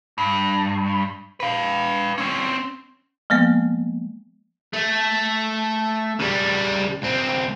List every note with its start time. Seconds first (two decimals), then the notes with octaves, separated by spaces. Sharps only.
0.18 G2
1.40 B4 F5
2.18 C4 C#4
3.30 F3 G#3 A#3 B3
4.74 A3
6.19 C#3 G3
7.02 C#2 C4